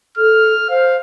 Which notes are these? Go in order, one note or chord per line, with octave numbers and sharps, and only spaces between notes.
A4 F6
C5 F5